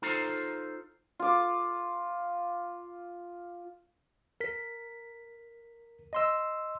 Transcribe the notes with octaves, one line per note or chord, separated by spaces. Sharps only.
D#4 F4 A4 C5 A#5
F4 D6
A#4 B6
D#5 C6 E6